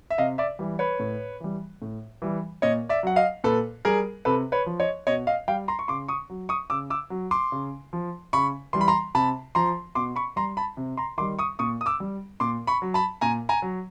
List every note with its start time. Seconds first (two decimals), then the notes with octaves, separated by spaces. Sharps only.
0.10 E5
0.18 C3 D#5 F5
0.38 D5 E5
0.59 E3 G3
0.79 B4 C#5
0.99 A2
1.40 E3 G3
1.82 A2
2.22 E3 G3
2.62 A#2 C#5 D#5
2.89 D5 E5
3.03 F#3 F#5
3.16 D#5 F5
3.44 A#2 A4 B4
3.85 G3 G#4 A#4
4.25 C3 A4 B4
4.52 B4 C#5
4.66 F3
4.80 C#5 D#5
5.07 B2 C#5 D#5
5.27 D#5 F5
5.48 G3 F5 G5
5.68 A#5 C6
5.79 C#6
5.88 C#3 C6 D6
6.08 C#6 D#6
6.30 F#3
6.49 C#6 D#6
6.70 C#3 D6 E6
6.90 D6 E6
7.10 F#3
7.31 C6 D6
7.52 C#3
7.93 F3
8.33 C#3 B5 C#6
8.73 E3 G3 C6
8.81 B5
8.88 A#5 C6
9.15 C3 A5 B5
9.55 F3 A#5 C6
9.95 B2 C6 D6
10.16 B5 C#6
10.36 G3 A#5 C6
10.57 A5 B5
10.77 C3
10.97 A#5 C6
11.18 D#3 C6 D6
11.20 G3
11.39 C#6 D#6
11.59 A#2 C#6 D#6
11.81 D#6
11.86 D6 E6
12.00 G3
12.40 A#2 C6 D6
12.67 B5 C#6
12.82 F#3
12.94 A5 B5
13.21 A#2 G#5 A#5
13.49 G#5 A#5
13.62 F#3